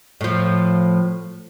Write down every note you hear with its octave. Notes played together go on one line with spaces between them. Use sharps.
A2 F3